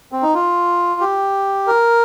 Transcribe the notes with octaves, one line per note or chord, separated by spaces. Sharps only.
C4
D#4
F4
G4
A#4